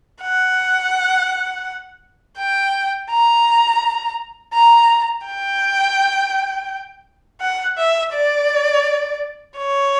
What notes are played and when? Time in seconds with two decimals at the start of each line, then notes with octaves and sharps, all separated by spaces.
0.22 F#5
2.38 G5
3.11 A#5
4.54 A#5
5.26 G5
7.41 F#5
7.78 E5
8.14 D5
9.58 C#5